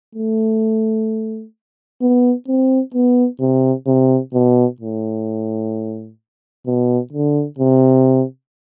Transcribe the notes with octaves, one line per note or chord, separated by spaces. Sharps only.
A3
B3
C4
B3
C3
C3
B2
A2
B2
D3
C3